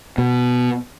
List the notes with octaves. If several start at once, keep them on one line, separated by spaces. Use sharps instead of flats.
B2